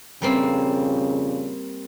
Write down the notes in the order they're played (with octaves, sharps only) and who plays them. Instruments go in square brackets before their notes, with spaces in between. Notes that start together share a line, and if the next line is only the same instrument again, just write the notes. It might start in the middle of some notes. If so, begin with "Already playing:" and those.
[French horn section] F2 A#2 C#3 [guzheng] G3 A#3 C4